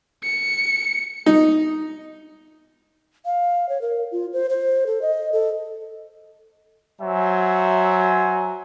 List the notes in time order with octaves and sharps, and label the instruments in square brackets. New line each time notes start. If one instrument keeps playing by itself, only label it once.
[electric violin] C#7
[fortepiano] D#4
[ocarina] F5
C#5
A#4
F4
C5
C5
A4
D#5
A4
[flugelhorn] F#3 [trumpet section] C5 E5 G#5